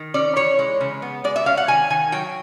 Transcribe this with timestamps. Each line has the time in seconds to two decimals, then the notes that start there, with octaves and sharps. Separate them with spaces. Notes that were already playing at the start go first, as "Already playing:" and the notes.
Already playing: D#3
0.14 C#4 D5
0.36 E3 C#5
0.59 G#3
0.81 C#3
1.02 B3
1.24 G#3 D5
1.36 E5
1.46 C#4 F5
1.57 F#5
1.68 D#3 G#5
1.90 D#3 G#5
2.12 F#3 G5